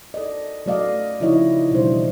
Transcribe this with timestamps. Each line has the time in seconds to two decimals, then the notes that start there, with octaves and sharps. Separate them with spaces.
0.14 A4 D5 D#5
0.66 F#3 A3 D5 D#5 F5
1.20 C#3 F3 D#4 E4 C#5 D#5
1.71 B2 F3 G3 D4 C5
1.82 E3